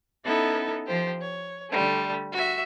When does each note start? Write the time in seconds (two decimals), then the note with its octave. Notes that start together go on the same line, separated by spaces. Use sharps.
0.24 B3 C#4 D#4 E4 A4
0.87 F3 G4 C5
1.21 C#5
1.70 D3 G3 A3
2.32 F#4 E5